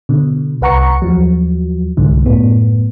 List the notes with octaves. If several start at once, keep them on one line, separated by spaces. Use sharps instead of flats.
B2 D3
C2 B4 F#5 A#5 C#6 C#7
D#2 F3 F#3
C2 G#2 D3
F#2 A2 B3